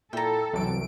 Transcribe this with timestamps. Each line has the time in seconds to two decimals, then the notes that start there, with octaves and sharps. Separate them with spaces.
0.13 A#2 E4 A4 G5 A#5
0.53 C2 F#2 E3 F#3 D7